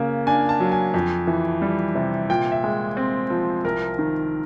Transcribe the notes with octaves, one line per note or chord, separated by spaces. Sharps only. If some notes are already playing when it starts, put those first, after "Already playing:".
Already playing: C#3 A#3
D4 G#5
A5
F#3
G#5
F2
E3
G3
C3
A#2 G5
E5
G#3
C4
F3
C2 A#4
D#3